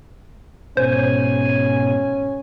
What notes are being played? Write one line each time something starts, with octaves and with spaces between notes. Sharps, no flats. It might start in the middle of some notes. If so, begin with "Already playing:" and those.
G#2 B2 C#4 C5 G#5